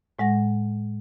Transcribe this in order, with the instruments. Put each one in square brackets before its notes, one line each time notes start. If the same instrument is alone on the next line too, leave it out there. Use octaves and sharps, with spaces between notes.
[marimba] A2 G#3 F#5 A#6